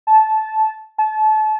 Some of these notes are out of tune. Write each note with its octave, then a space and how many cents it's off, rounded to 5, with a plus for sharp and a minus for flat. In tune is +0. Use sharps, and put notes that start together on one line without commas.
A5 -15
A5 -30